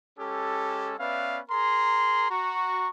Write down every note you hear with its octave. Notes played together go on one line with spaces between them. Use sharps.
G#3 C#4 G4 A4
B3 C#4 B4 D5 E5 F5
G#4 A#4 A#5 C6
F#4 A#5 C#6